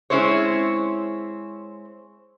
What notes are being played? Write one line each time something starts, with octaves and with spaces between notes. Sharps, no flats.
G#3 C4 C#4 E4 C5 C#5